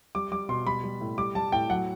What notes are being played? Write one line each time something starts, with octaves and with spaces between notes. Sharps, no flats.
G3 D6
G3 D6
B2 C6
G3 B5
G3
A2
G3 D6
G3 A5
A2 G5
F#3 F#5